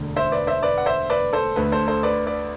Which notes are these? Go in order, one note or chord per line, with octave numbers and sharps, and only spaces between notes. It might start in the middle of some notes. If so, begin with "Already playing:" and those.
Already playing: E1 D2 D3
C5 E5
B4 D5
C5 E5
B4 D5
F#5
C5 E5
B4 D5
A4 C5
D2 D3 A3 B4
A4 C5
A4 C5
B4 D5
B4 D5